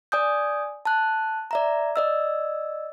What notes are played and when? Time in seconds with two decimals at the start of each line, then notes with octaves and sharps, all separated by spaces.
0.12 D5 G#5 D#6 G6
0.85 A5 F#6
1.51 D5 E5 A#5
1.96 D5 D#5 E6